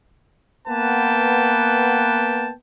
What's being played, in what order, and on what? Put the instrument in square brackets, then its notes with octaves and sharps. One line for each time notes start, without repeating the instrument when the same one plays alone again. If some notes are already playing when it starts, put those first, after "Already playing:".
[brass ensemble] A#3 B3 B4 F#5 G5 A5